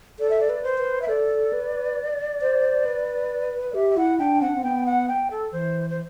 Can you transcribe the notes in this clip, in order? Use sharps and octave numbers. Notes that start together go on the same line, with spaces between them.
A4 D5
E5
D5
B4
C5
B4
E5
A4 D5
B4
C5
B4
D5
G4 E5
E5
E4 F#5
D4 G5
C4 F#5
D4
C4
B3 G5
F#5
G5
A4
E3 C5
C5